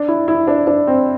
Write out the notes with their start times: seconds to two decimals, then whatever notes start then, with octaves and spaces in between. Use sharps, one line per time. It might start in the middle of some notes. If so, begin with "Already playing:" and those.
Already playing: D4
0.08 E4
0.28 E4
0.48 D4
0.67 D4
0.87 C4